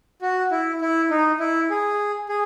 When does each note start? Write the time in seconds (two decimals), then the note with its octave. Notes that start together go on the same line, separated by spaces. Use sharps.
0.22 F#4
0.51 E4
0.81 E4
1.10 D#4
1.40 E4
1.70 G#4
2.29 G#4